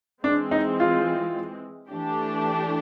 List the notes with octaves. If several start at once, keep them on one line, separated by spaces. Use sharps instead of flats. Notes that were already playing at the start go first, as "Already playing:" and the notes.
E3 G#3 C4 D4
D#4
F4
E3 A3 D4 G4